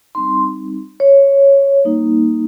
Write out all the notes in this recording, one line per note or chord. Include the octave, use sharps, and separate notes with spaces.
G3 C4 D#4 C6
C#5
G3 A#3 D#4